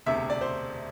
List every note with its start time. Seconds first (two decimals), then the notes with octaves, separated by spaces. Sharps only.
0.06 E1 D2 C3 E5
0.30 D5
0.41 C5